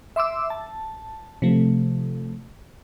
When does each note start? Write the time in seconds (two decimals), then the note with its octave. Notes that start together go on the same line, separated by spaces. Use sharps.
0.16 E5 C6 D6 E6
0.50 A5
1.42 C3 F3 A3